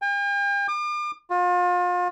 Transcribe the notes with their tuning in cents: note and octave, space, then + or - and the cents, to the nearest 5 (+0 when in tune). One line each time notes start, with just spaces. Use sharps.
G5 +45
D6 +40
F4 +35